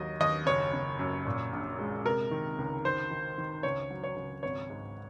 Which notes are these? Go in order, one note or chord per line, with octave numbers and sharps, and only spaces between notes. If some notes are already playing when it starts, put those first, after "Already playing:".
Already playing: D#2 F#3 D#5
D#2 D#5
F#1 C#5
F#1
F#2
A#2
A#1
G#3
C3 A#4
D#3
C#2
D#3 C5
D#3
D#3
C#2 C#5
F#3
C#5
C#2
G#1 C#5
G#2